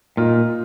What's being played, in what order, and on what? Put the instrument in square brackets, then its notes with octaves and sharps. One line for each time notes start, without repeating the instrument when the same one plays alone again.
[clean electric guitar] A#2 [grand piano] D#4 F4